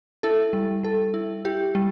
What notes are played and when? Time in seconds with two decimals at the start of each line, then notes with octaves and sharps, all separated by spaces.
0.23 E4 A4
0.53 G3
0.83 G3 A4
1.14 E4
1.45 E4 G4
1.75 G3